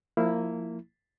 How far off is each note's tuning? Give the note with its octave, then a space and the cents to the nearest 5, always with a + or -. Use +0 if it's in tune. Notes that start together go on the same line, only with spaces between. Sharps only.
F3 +15 A#3 -15 E4 +0